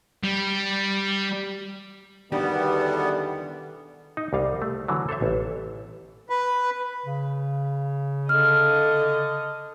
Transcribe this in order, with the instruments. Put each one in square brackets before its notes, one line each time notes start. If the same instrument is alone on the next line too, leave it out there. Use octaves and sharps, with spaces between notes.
[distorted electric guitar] G3
[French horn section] E2 B2 D3 [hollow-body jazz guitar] D#3 D4 G4 [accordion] G3 B3
[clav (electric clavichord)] D#4
C2 G3 F5
A3
D3 E3 F#3
A4 C5 C#5 E5
A1
[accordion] B4
[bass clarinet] C#3
[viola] D3 D#5 [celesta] F6